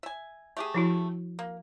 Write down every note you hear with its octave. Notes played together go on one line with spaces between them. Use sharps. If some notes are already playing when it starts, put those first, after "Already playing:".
E5 G#5
A3 G4 G#4
F3 E4 F#4
A#3